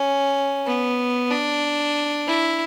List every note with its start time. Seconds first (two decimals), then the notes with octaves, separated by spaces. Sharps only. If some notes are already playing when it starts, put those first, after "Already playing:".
Already playing: C#4
0.66 B3
1.30 D4
2.27 E4